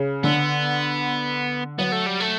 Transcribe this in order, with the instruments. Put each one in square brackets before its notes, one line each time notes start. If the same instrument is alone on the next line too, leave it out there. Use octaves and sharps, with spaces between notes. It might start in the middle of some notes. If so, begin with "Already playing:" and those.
Already playing: [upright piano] C#3
[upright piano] D3 [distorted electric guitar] B3
[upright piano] F#3 [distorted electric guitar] B3
[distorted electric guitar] A3
G3
A3